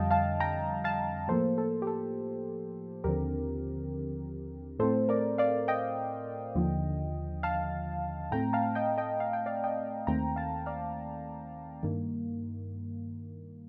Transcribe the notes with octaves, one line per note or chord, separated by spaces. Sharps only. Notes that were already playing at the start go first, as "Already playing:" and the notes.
Already playing: F2 D3 G3 D#5 F5 G5 A5
F5 A5
G5 A#5
F5 A5
A2 F3 A#3 A4 C5
A4
G4
A4
D#2 D3 F3 C4 G4 A#4
A2 A3 C4 A4 C5
A#4 D5
D5 F5
D#5 G5
D#2 D3 F3
F5 A5
A2 A3 C4 G5 A#5
F5 A5
D#5 G5
D#5 G5
F5
G5
D5 F5
D#5 G5
D#2 D#3 A3 C4 G5 A#5
F5 A5
D5 F5
G2 D#3 A#3